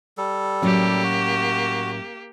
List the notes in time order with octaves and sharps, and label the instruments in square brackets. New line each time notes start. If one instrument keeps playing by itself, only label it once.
[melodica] G3 A4
[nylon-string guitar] A2 F#3 C#4 [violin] A#3 G4
[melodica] F#4